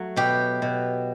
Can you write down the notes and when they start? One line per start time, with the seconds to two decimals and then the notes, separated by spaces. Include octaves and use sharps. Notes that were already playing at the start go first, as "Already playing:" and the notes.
Already playing: F#3 A3
0.16 B2 G4
0.62 B2